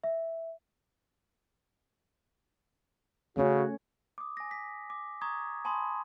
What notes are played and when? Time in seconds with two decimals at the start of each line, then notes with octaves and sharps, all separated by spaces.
0.04 E5
3.37 C#3 A3 C#4 F#4 C#5
4.18 D6 D#6
4.37 G#5 A#6
4.51 B6
4.90 D6
5.22 A#5 C#6 D#6 G#6
5.65 G#5 A5 B5 C6 D#6